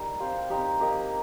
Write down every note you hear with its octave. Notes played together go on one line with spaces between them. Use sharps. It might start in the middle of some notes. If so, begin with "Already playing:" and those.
Already playing: G3 D#4 A#4 D#5
C4 G4 C5 F5
C4 D#4 G4
A#3 G4 D#5